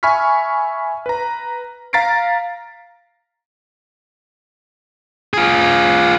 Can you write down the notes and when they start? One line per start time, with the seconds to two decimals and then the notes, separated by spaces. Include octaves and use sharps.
0.03 E5 G#5 B5 C#6 F6 B6
1.06 B4 A#5
1.93 F5 A#5 A6 B6 C7 D7
5.34 F4 G#4